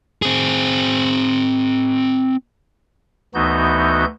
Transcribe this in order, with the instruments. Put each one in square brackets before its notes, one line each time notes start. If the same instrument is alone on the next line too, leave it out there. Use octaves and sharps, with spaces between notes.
[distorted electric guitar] C4 G#4
[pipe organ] D2 E3 B3 D#4 F#4 G6